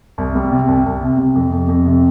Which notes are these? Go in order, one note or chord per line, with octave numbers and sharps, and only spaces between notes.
C2
G3
C3
C2
C2
C3
C3
F2
F2
F2
C3